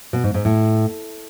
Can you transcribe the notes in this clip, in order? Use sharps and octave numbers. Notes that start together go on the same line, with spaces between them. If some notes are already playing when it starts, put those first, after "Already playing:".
B2
G#2
G#2
A2